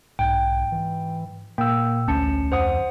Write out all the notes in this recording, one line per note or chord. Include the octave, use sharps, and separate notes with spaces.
B1 G#2 G5
E3
A#2 A#3 G5 E6
A1 D2 C#4 A5 C#7
F2 C5 F#5 D#6